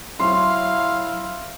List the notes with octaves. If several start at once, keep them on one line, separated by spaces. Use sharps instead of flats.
F#3 E4 F5 C6